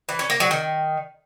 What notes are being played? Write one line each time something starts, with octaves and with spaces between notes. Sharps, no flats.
E3
C#4
A#3
F#3
D#3